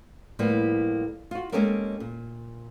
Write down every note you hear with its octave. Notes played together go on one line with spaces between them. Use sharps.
A2 F3 G3 A#3 B3
F4 F#4
G#3 A#3 C#4 G4 A4 A#4
A#2